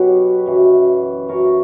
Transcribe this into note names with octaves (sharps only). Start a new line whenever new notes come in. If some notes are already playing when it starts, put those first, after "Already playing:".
Already playing: B2 F#3 G4 B4 C#5
F#2 E3
F#2 E3 A#4 C#5